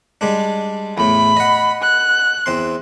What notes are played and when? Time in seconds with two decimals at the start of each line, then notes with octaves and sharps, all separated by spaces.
0.21 G3 G#3 D4
0.98 E2 A2 B5
1.37 D#5 F#5
1.83 F#6
2.46 E2 C4 C6